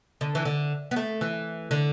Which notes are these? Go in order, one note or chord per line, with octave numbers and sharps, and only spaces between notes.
D3
E3
D3
B3
A3
E3
D3